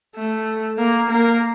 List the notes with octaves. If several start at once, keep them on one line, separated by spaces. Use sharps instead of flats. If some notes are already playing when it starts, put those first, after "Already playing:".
A3
A#3
A#3